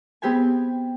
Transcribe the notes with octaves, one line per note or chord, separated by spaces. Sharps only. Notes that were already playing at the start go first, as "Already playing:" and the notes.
B3 C4 G4 G#4 G#5